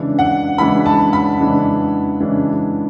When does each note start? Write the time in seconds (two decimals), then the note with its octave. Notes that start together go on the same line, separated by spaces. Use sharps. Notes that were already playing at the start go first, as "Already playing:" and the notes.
Already playing: C#3 E3 G#3 D4
0.19 F#5
0.58 C#3 E3 G#3 D4 B5
0.86 A5
1.13 B5
1.39 C#3 E3 G#3 D4
2.20 C#3 E3 G#3 D4